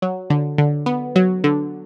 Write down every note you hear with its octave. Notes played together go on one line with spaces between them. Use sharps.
F#3
D3
D3
B3
F#3
D3